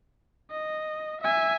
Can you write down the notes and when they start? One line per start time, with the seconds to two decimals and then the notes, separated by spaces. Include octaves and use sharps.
0.51 D#5
1.22 E5 G#5